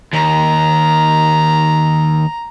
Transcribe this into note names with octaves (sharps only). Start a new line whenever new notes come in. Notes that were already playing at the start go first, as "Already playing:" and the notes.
D#2 A#5